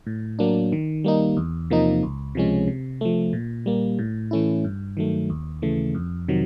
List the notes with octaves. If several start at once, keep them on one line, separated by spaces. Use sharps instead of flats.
A2
F#3 A#3 D4
D#3
G3 A#3 D#4
E2
C3 F3 A#3 D#4
C#2
C3 F3 G#3 C#4
C3
F3 A3
A#2
G3 A#3
A2
E3 A3 C#4 E4
G2
D#3 F#3 A3
D#2
C#3 E3 A3
F2
C3 D#3 F#3